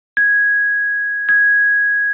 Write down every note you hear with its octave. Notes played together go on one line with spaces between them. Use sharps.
G#6
G#6